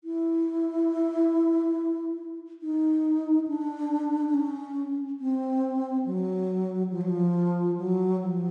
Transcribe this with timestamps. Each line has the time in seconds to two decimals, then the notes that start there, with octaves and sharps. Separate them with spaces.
0.04 E4
2.62 D#4
3.48 D4
4.29 D4
4.34 C#4
5.20 C4
6.06 F#3
6.91 F3
7.01 F#3
7.10 F3
7.78 F#3
8.21 F3